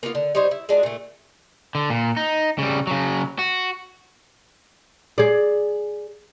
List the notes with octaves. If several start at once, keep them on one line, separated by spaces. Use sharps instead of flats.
A#3 B3 F4
D3
G3 D#4 C5 C#5
E4
G#3 D4 F4 F#4
A#2 A3
D3
A#2
D#4
C#3 G3
C#3 F#3
F#4
G#4 D5